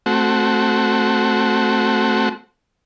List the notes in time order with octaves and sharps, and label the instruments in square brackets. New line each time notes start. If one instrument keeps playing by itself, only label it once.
[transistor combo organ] A3 C4 F#4